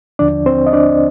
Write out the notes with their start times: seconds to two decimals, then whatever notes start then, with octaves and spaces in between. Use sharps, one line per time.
0.19 D#2 D3 F3 D4 D5
0.46 C4 C5
0.67 D#5
0.73 D4 D5